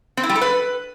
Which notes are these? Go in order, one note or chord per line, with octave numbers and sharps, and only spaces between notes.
C4
E4
G3
A4
B4